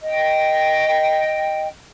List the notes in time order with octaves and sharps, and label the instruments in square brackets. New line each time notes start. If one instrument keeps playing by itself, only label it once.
[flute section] D#5 G5